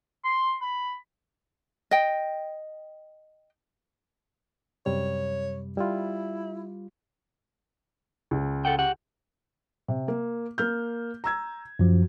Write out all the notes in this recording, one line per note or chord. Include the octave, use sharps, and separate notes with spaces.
C6
B5
D#5 G5
F#2 C3 G3 C#5
G3 E4 F4
C#2
A4 F#5 G5
G4 F#5
C3
A#3
A#3 F6 G6
A#5 E6 G#6
F#2 F3 F#3